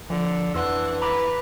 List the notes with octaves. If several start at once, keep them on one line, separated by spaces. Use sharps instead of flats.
D3 F3
F2 E3 D4 F#5 C6 E6
B4 A#5 B5 D6